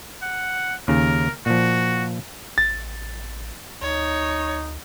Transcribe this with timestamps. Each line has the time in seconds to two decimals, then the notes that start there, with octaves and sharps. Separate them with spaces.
0.22 F#5
0.88 D#2 C#3 A#4
1.46 A#2 F3 F#4
2.58 A1 A6
3.82 D2 D#4 C#5